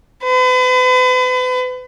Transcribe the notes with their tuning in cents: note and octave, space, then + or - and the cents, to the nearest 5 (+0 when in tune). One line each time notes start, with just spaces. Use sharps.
B4 +40